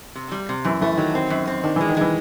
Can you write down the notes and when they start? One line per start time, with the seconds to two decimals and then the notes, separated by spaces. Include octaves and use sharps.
0.15 C3
0.32 G3
0.49 C3
0.65 F#2 E3
0.81 E3 A3
0.97 D#3 F#3
1.15 C4
1.30 F#2
1.47 C4
1.64 D#3 D4
1.76 E3 G#3
1.89 D#3
1.97 E3 G#3